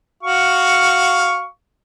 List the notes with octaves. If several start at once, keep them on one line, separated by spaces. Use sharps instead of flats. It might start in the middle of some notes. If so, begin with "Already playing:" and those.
F#4 F5 C#6